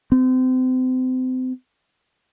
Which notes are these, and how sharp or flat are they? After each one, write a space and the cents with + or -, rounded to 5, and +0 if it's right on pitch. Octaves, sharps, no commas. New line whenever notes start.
C4 -35